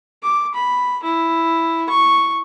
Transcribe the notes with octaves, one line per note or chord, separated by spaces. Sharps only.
D6
B5
E4
C#6